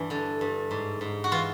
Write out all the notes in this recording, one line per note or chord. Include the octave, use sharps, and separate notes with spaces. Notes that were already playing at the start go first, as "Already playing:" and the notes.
Already playing: G2 E3
D3
G2
G#2
G#2
F#4
E3 F4